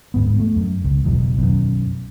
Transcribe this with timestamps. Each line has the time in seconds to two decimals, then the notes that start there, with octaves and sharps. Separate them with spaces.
0.14 D1 G#2 B3
0.39 A3
0.56 F#2
0.84 C#2
1.04 F#1 B1 E2
1.38 B1 F#2